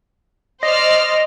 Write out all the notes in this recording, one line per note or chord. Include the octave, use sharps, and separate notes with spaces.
C5 D5 D#5 F6